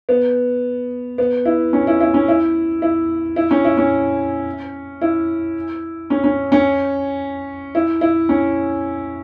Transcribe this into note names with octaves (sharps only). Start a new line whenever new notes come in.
B3
B3
E4
C#4
E4
E4
C#4
E4
E4
E4
C#4
E4
C#4
E4
C#4
C#4
C#4
E4
E4
C#4